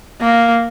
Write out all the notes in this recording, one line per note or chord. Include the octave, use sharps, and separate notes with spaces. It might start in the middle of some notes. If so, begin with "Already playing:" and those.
A#3